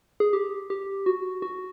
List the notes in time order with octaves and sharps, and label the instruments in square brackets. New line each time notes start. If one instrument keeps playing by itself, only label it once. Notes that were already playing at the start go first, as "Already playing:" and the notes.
[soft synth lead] G#4
G4
G4
F#4
F#4